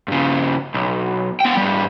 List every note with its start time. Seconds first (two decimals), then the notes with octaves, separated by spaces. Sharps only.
0.08 G2 C#3
0.74 B1
1.40 B3 G5
1.57 G#2 G3